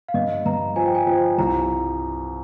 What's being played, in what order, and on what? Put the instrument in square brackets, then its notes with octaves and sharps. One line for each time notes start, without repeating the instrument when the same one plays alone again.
[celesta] F5
[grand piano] G2 [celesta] D#5
[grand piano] G2 [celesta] A#5
[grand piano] F3 [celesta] G#5
[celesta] G5
G#5
[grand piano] F3 [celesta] G5
[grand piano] C2 [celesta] A#5